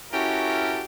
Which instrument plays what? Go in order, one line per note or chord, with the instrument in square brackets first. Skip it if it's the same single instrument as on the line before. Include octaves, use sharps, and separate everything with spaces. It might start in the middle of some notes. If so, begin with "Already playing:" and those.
[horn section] C#4 E4 F#4 G4 A4 A#4